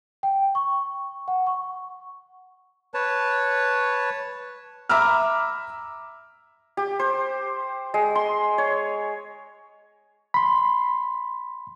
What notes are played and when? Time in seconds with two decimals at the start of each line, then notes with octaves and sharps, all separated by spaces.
0.23 G5
0.55 C#6
1.28 F#5
1.47 C#6
2.94 B4 C#5 A5
4.89 E5 A#5 B5 D6 E6 F6
6.77 G4
6.99 C5
7.94 G#3
8.15 C6
8.58 C#5
10.34 B5 C6